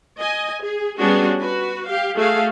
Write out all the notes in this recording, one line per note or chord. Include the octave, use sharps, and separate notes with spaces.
D#5 G#5
G#4
G3 B3 C#4 D4 F#4 G#4
F#4 B4
G4 F5
A3 F#4 G#4 F5